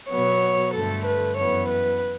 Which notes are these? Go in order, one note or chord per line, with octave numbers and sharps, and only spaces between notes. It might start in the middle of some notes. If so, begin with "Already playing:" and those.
B2 F#3 B3 C#5
G2 D3 A3 A4
B4
F#2 E3 B3 C#5
B4